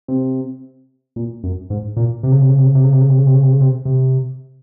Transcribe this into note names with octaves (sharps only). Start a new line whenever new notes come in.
C3
A#2
F#2
G#2
A#2
C3
C#3
C3
C#3
C3
C#3
C3
C#3
C3
C#3
C3
C#3
C3
C#3
C3
C#3
C3
C3